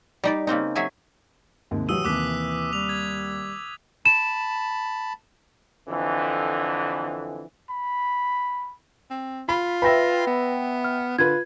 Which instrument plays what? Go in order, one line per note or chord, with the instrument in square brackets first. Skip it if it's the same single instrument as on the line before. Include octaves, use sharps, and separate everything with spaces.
[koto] G3 D#4 D5
C#3 A#3 C4 D#4
F#3 G#4 E5 G#5
[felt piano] D#2 G#2 C3
[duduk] E3 [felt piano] F#3 F#4 G4 [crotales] D#6 E6 D#7
[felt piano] D#2 C3 [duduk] E3 [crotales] D6 F#6 B6
[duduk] G3 [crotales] F7
[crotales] G#6
[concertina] A5 B5 [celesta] E7
[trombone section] F2 D3 E3
[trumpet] B5
[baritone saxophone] C4
[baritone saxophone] F4 [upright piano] B5
[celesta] B4 A#6 [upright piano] E5 G5 B5
[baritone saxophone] B3
[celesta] F6
[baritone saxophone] D3 [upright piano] F4 B4 [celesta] G#6